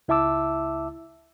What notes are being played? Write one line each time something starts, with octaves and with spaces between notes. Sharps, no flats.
C#2 E4 E5 A5 D6 E6